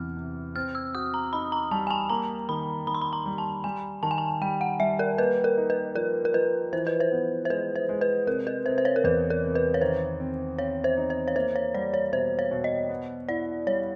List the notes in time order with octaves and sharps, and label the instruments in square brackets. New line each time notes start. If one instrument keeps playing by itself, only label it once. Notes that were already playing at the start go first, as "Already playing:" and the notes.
Already playing: [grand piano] E2 C3 E3 [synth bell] F6
[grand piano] C3
[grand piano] C4 [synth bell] F6
[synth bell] E6
[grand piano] F#4 [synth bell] D#6
[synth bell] A#5
[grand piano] D#4 [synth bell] B5
[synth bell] A#5
[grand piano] G3 [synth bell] A5
[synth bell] G#5
A5
[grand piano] A#3 [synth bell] A#5
[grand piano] D#3 [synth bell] B5
[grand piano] D#3 [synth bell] B5
[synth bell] C6
B5
A#5
[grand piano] G3
[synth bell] A5
[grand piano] G3 [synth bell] G#5
[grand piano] D#3 [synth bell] A5
[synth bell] G#5
A5
[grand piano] G3 [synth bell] G5
[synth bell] F#5
[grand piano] G3 [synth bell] E5
[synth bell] A#4
[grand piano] A#3 [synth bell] B4
[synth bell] A#4
[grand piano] D#4
[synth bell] B4
[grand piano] F3 [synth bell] A#4
[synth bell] A#4
[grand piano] F3 [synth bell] B4
[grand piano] E3 [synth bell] C5
[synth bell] B4
C5
[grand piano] B3
[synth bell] C5
[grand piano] G#3 [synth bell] B4
[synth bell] C5
[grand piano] G#3
[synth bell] B4
[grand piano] C3 [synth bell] A#4
[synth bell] B4
[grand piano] C3 [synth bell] C5
[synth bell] C5
C#5
A#4
[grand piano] E2 [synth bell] B4
[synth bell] A#4
[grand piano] C3
[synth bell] B4
C#5
[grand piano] D#3 [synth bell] C5
[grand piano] C4
[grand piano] C4 [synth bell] C#5
[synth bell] C5
[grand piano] D#4
[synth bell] C5
C#5
[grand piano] A#3 [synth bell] C5
[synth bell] C#5
[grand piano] G3 [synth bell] D5
[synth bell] C#5
[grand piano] B2 [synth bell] C5
[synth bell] C#5
[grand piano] B2
[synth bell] D#5
[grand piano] B3
[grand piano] E4 [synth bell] D5
[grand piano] G3 [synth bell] C#5